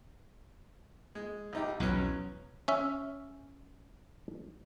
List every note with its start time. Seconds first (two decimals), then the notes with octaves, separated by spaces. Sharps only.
1.15 G#3
1.53 C2 D#4 G4
1.80 B1 E2 F#3 B3 C#4
2.68 C#4 E5